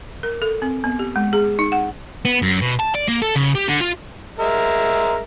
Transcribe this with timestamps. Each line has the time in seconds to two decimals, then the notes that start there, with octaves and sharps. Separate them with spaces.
0.23 A#4
0.42 A4
0.62 C4
0.84 B3
0.99 G4
1.16 G#3
1.33 G#4
1.59 D#4
1.72 F#5
2.25 B3
2.42 F#2
2.62 B2
2.79 A5
2.95 D5
3.08 A#3
3.22 A4
3.36 C#3
3.55 G4
3.68 D3
3.81 F4
4.39 G#3 A#4 E5